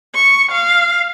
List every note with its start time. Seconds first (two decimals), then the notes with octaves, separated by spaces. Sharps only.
0.14 C#6
0.51 F5